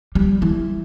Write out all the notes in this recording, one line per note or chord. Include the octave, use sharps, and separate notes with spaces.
G3
E3